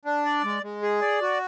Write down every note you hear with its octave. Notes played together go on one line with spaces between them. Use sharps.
D4
D5
G#3
G#3
G#4
D5
F#4